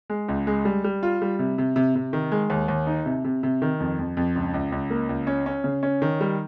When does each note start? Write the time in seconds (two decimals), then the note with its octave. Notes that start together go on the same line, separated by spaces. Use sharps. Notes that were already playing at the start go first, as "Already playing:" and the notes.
0.10 G#3
0.28 C#2
0.47 G#3
0.65 G3
0.84 G3
1.03 F4
1.22 G3
1.39 C3
1.58 C3
1.76 C3
1.95 C3
2.13 D#3
2.32 G#3
2.50 D#2
2.68 D#2
2.87 D#4
3.06 C3
3.24 C3
3.43 C3
3.62 D#3
3.80 F2
3.99 F2
4.17 F2
4.35 C#2
4.54 C#2
4.72 C#2
4.90 A#3
5.09 C#2
5.27 C#4
5.46 C#4
5.64 C#3
5.83 C#4
6.02 D#3
6.21 G3